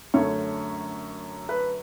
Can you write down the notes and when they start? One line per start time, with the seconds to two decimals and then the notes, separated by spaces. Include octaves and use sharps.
0.14 F#2 D3 A3 C#5
1.49 B4